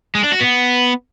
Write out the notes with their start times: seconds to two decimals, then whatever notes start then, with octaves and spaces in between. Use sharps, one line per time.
0.15 G#3
0.23 D4
0.32 F#4
0.40 B3